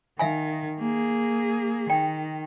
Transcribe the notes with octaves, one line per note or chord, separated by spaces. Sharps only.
D#3 E5 F5 G#5
A#3 G#4
D#3 G5